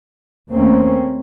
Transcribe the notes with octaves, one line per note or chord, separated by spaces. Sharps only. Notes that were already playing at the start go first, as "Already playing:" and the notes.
D#2 A3 A#3 C4 C#4